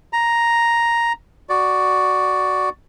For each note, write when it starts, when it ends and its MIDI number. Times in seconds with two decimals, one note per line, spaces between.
0.13 1.13 82
1.49 2.69 66
1.49 2.69 74